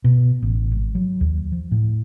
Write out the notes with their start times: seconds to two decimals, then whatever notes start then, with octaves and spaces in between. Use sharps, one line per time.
0.04 B2
0.42 A1
0.71 G#1
0.95 F#3
1.21 D#2
1.52 F3
1.71 A2